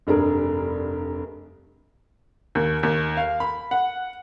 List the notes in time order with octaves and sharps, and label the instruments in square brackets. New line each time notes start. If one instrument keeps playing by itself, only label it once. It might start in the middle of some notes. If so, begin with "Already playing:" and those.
[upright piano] F1 G2 D4 G#4 A#4
D#2
D#2
F5
B5
F#5